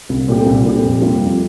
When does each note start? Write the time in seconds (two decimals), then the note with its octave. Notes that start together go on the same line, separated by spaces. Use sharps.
0.09 C2
0.28 A#2 A3 C4 G4
0.46 C2
0.65 A#2 A3 C4 G4
0.83 F2
1.02 C3 G3 A#3 F4
1.20 F2